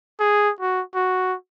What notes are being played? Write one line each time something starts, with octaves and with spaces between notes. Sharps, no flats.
G#4
F#4
F#4